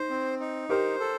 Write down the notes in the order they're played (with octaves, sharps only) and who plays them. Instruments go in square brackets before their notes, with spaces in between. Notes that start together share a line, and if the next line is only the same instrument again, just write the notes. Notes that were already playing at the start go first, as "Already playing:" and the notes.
Already playing: [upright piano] D#4 [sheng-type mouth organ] C5
[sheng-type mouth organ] C4
D#4
[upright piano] G4 A#4 [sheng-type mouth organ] C5
[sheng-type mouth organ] A4